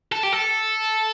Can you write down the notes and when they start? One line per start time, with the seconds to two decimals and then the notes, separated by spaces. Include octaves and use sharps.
0.12 A4
0.23 G4
0.32 A4